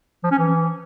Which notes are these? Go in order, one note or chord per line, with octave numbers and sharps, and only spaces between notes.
F3
C#4
E3